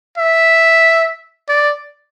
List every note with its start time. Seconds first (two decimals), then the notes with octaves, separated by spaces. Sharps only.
0.18 E5
1.48 D5